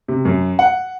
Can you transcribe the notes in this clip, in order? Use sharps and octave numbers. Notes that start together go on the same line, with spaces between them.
C3
F#2
F#5